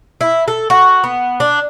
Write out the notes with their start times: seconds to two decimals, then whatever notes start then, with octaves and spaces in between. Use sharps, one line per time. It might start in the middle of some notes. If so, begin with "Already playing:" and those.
0.21 E4
0.48 A4
0.70 F#4
1.04 B3
1.40 D4